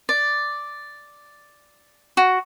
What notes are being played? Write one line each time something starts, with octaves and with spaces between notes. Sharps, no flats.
D5
F#4